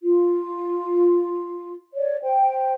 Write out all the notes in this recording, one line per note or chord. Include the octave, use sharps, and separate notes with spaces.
F4
C#5 D5
C5 G5